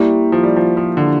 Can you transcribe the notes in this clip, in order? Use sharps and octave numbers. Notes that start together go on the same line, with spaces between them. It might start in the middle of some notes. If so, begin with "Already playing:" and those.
Already playing: G3 A#3 E4 G4
F3
G3
F3
F3
D3